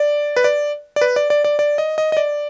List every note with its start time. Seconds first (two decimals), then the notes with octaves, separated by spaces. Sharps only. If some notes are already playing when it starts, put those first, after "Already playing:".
Already playing: D5
0.36 B4
0.44 D5
0.96 D5
1.01 B4
1.16 D5
1.30 D5
1.44 D5
1.59 D5
1.78 D#5
1.98 D#5
2.12 D#5
2.17 D5